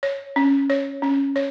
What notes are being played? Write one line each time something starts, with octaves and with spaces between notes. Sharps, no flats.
C#5
C#4
C#5
C#4
C#5